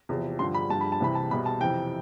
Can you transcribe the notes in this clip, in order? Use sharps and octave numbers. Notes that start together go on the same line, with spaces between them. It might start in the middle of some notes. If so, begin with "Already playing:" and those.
E2 C3 F3
G2 D3 F3 C6
B5
G2 F3 A5
B5
A5
C2 C3 E3 B5
A5
C2 B2 B5
A5
F2 C3 E3 G5